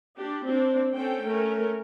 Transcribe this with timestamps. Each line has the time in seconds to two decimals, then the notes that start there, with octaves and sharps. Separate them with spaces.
0.15 D4 G4
0.45 C4 D4
0.92 C4 C#4 A4 G5
1.24 A3 C#4 A#4